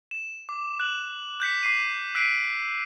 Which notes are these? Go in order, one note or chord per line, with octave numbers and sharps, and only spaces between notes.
E7
D6
F#6 F#7
F#6 G6 B6 C#7
D6 C7 D#7
E6 F#6 B6 C7 D7 D#7